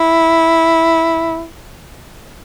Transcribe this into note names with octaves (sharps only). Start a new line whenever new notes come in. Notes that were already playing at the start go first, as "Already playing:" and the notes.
Already playing: E4